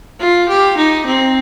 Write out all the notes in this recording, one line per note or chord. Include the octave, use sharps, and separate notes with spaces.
F4
G4
D#4
C4